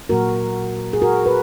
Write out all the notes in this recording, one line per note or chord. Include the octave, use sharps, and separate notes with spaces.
A#2 F#3 A#3 F#4 A#4
G#4
F#4 A#4
B4